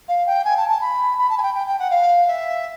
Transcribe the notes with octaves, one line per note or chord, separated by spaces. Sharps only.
F5
G5
G#5
A5
A5
B5
B5
A5
G#5
G5
G5
G5
F#5
F5
E5